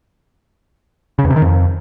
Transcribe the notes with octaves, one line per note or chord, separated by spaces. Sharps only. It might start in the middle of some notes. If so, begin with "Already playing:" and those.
C#3
E2
C3
D#3
F2